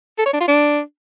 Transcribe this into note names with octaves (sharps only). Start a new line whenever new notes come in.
A4
C#5
D4
F4
D4